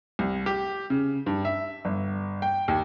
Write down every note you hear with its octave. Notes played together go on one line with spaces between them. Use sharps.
C2
G4
C#3
G2
E5
G1
G5
D#2